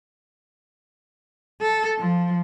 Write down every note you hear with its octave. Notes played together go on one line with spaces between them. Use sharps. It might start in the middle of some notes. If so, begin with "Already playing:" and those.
A4
F3